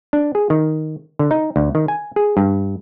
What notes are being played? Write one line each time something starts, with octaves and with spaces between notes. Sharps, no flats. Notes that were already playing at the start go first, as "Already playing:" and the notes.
D4
G#4
D#3
D3
D#4
D2
D#3
G#5
G#4
G2